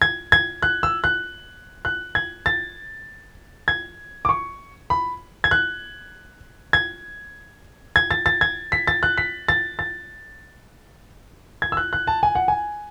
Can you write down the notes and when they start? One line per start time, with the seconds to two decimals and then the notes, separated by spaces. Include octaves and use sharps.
0.02 G#6
0.32 G#6
0.62 F#6
0.83 E6
1.04 F#6
1.85 F#6
2.15 G#6
2.46 A6
3.68 G#6
4.25 D6
4.29 C#6
4.90 B5
5.44 G#6
5.51 F#6
6.73 G#6
7.96 G#6
8.11 A6
8.26 A6
8.41 G#6
8.72 B6
8.87 A6
9.03 F#6
9.18 B6
9.48 A6
9.79 A6
11.62 G#6
11.72 E6
11.77 F#6
11.93 F#6
12.07 A5
12.23 G#5
12.35 F#5
12.48 G#5